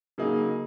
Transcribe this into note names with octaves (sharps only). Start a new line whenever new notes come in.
C#3 F#3 A#3 D#4 G#4